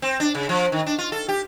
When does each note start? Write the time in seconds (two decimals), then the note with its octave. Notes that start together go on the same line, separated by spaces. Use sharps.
0.02 C4
0.20 D4
0.35 C#3
0.49 F3
0.72 D#3
0.86 D4
0.98 F4
1.12 A4
1.28 G4